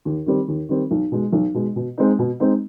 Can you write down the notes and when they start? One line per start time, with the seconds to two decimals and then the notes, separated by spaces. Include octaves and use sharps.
0.05 D#2
0.26 D#3 G3 C4
0.48 D#2
0.69 D#3 G3 C4
0.91 B1
1.12 B2 G#3
1.33 B1
1.54 B2 G#3
1.76 B2
1.98 G#3 C4 D#4
2.19 B2
2.40 G#3 C4 D#4